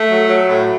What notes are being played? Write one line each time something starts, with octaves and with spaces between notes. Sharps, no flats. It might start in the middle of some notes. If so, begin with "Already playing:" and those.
Already playing: A3
F#3
F#3
A2